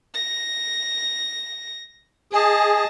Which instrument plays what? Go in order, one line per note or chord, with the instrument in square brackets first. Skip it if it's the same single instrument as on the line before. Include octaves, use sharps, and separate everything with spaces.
[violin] A#6
[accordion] G#4 [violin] D#5 A5